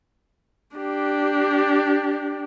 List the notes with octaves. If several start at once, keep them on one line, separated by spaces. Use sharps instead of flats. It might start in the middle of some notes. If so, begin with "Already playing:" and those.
D4 G4